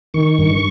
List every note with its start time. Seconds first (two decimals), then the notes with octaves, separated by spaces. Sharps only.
0.14 D#3 C#6
0.39 G2